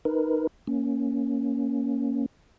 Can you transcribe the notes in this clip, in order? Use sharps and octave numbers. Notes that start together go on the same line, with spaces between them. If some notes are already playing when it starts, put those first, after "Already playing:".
D#4 A#4 B4
A#3 C#4